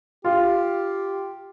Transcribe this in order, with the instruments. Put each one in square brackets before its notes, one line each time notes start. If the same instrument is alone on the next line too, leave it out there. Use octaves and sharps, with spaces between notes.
[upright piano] F4 [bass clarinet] G4